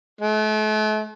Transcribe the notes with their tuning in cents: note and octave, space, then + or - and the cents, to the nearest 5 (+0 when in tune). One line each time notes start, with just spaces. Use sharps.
A3 -40